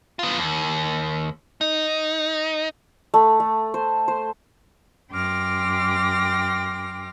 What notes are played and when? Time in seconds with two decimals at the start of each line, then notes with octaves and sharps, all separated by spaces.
0.19 B3 F4
0.39 D#2
1.61 D#4
3.14 A3
3.40 A3
3.74 C5
4.08 C5
5.11 F#2 G5 C6 D6 F6 A#6